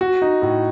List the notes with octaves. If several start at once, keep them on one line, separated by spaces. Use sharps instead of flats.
F#4
D#4
A2